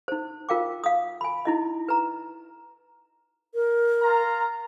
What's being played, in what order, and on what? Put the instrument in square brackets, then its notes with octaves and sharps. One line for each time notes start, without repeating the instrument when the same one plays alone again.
[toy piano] D#4 C5
F4 A#4 F5 G5 D6
F5 D#6
G#5 B5
D#4 E4 D#5
B4 A#5
[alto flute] A#4
[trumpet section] F4 A#5